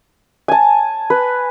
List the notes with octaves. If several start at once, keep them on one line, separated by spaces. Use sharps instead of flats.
G#5 A5
B4